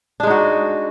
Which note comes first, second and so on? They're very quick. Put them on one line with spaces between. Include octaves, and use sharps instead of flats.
D4 G#3 D#4 F#4